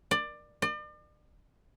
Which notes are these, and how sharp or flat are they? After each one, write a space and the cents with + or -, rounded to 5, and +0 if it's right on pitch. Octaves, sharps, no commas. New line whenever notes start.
D5 +20
D5 +40